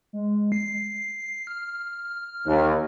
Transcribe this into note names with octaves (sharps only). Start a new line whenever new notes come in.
G#3
C7
F6
D#2